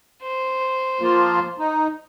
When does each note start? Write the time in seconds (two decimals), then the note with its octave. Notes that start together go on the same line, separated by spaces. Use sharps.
0.22 C5
1.01 F3 A#3 F4
1.59 D#4